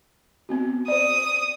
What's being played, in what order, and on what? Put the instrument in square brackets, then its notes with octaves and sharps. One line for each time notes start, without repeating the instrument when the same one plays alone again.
[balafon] B3 C4 F#4
[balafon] C5 D5 [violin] D#6